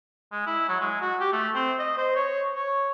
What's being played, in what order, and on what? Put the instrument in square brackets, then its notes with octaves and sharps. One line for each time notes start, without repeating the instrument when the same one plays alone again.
[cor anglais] G#3
E4
F#3
G#3
F#4
G4
A3
C4
D#5
C5
C#5
C#5